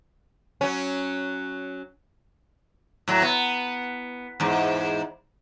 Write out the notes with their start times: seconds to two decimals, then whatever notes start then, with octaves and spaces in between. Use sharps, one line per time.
0.61 F#3 C#4
3.08 A2 F#3
3.22 B3
4.40 E2 G#2